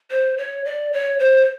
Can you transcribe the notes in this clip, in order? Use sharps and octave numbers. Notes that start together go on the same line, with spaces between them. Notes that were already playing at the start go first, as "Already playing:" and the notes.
C5
C#5
D5
C#5
C5